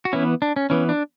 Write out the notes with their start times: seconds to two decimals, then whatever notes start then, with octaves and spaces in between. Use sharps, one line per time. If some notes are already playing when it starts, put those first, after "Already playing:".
0.05 F#4
0.13 E3 B3 C#4 E4
0.42 D4
0.56 C#4
0.70 E3 B3 C#4
0.89 D4